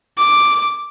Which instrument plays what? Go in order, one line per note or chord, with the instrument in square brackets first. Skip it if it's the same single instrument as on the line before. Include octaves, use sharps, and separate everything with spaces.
[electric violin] D6